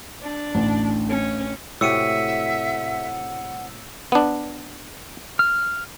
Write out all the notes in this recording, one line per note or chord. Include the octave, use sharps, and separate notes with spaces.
D4
A1 D2
C#4
A2 C3 F#4 E5 F#5 E6 C#7 D#7
B3 D4
F6